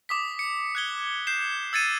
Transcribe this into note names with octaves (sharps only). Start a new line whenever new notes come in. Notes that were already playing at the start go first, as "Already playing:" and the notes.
D6 D#6 B6
C#7
F#6 G#6 G7
G6 C7 E7
E6 G#6 A6 C#7 D#7 E7